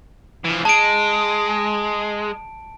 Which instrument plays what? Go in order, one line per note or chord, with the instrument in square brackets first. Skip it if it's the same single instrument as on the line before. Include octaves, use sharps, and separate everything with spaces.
[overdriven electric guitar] E3 F3
[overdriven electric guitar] G#3 [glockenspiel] A5 D7